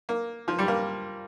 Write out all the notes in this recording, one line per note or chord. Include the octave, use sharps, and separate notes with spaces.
A#3
F3
G3
A#3